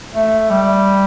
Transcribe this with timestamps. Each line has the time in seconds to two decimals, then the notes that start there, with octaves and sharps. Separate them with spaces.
0.15 A3
0.50 G3